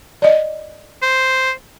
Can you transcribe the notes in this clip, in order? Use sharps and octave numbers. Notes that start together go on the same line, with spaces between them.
D5 D#5
C5